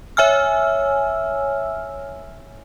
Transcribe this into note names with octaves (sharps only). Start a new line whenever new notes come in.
C#5 E5 G#5 E6 F6